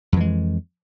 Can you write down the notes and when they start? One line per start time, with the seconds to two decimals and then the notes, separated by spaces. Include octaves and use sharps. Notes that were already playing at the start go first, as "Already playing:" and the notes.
0.12 F2
0.16 E3
0.20 G#3